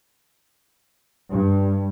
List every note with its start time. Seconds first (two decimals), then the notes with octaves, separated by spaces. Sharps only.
1.31 G2